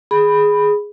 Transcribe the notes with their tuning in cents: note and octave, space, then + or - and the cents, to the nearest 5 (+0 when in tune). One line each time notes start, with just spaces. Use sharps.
G#4 +0 B5 +0